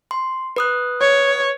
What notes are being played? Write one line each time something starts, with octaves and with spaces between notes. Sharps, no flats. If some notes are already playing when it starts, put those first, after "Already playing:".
C6
B4 D#6 F#6
C#5